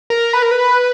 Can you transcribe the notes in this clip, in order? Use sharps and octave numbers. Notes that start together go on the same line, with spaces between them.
A#4
B4
A#4
B4